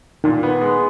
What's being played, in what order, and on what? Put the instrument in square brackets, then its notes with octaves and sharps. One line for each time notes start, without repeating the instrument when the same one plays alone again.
[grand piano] A#2 [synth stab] D#3
[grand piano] B3
G#3